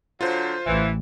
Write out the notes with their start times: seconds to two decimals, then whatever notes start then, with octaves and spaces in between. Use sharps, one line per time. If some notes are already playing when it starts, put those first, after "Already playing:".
0.21 D3 F#3 F4 C5
0.66 A1 E3